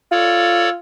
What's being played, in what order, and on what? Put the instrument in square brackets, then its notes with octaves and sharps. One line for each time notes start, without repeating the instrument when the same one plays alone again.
[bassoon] F4 [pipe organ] A4 C#5 D5